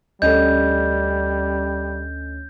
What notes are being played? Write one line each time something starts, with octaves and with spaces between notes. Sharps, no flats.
D2 G3 C#4 A4 D#5 G6